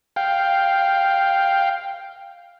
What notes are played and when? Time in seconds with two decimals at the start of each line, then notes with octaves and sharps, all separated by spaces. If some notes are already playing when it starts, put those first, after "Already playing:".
0.16 F5 G5